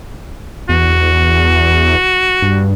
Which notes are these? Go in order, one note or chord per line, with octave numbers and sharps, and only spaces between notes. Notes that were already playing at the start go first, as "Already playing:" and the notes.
E2 F#4
G2